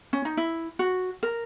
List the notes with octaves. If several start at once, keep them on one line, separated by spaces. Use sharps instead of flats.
C#4
D#4
E4
F#4
A#4